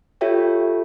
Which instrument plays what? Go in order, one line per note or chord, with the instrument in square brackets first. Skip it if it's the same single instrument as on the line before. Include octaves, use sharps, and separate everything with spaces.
[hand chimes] F4 G4 A4 C#5 E5 G5